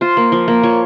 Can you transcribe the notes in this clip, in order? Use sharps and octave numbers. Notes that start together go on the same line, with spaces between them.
F4 C5
A#3
F3
A#3
F3 C#5